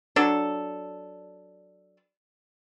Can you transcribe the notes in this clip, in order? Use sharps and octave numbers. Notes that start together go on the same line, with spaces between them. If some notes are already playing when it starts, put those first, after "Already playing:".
F#3 D4 A4